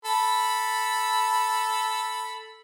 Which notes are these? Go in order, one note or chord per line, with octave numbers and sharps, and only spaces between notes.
A4 B5